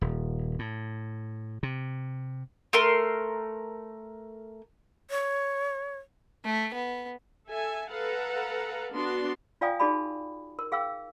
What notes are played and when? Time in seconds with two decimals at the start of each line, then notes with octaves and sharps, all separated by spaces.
0.01 D#1
0.59 A2
1.63 C3
2.73 A3 A#4 C6
5.10 C#5
6.45 A3
6.74 B3
7.48 A4 E5 G#5
7.90 A4 B4 F5 F#5 A#5
8.92 B3 D4 F#4 D5 C6
9.61 F4 D5 F5 G5 G#5 D#6
9.80 D#4 F#4 G#4 D5 A5 B5
10.59 A#4
10.72 G#4 F5 G5 E6